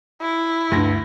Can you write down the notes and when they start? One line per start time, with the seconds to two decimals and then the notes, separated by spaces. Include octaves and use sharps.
0.21 E4
0.71 D2 G2 A#6